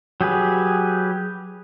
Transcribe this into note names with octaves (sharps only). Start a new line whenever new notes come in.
F#3 G4 G#4 B4